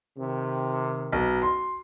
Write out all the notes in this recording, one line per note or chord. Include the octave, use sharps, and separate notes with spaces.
C3 D#3
B1
C6